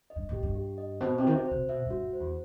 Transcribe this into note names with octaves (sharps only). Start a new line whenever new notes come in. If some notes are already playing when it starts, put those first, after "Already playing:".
D#5
G2
A2 G4
G2
G4
D#5
B2 C5
C3
D#3 F#4
C3
C5
C3
B2 E5
G2 F#4
G2
C5
E2